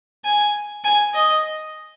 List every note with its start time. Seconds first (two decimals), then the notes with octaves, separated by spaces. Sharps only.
0.25 G#5
0.84 G#5
1.15 D#5